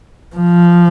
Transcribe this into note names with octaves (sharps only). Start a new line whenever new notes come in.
F3